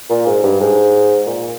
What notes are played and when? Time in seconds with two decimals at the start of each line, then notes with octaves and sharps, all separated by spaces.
0.10 A#2
0.26 G#2
0.43 G2
0.61 G#2
1.26 A#2